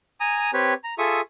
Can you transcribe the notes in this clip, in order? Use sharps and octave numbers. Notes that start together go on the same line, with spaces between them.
G#5 A#5 D#6
C4 G4 B4 C#5
A#5
F4 G#4 A4 E5 C#6 D#6